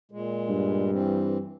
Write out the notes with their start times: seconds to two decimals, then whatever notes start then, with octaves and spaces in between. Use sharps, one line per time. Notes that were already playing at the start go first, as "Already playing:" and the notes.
0.12 A#2 G#3
0.49 G2
0.91 E3 C4